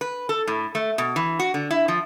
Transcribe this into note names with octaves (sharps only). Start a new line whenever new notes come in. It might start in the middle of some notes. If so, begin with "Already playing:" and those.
B4
A4
A2
A3
B2
E3
F#4
D3
E4
F3